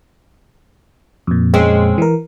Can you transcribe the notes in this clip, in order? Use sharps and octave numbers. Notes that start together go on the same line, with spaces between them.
F2 A#2
G#3 C4 C#4
E3 A#4